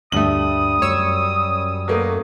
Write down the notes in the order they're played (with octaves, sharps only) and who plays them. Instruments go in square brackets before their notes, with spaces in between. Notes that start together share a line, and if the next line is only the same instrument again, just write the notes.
[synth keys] D2 G2 A3 [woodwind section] G3 D#6 [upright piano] F#7
[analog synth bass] F#2 [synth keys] C#5 E6
[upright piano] F#3 A3 A#3